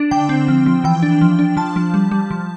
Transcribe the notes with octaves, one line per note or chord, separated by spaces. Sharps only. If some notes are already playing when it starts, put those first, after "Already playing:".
Already playing: D4
D3 G5
C4
F3
F3
E3 G5
D4
F3
D4
F3 A5
F3
G3
G3
F3